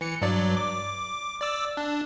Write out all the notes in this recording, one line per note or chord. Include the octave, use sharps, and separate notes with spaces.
E3 C#7
G2 F#3 D5
D6
D5 D6 E6
D4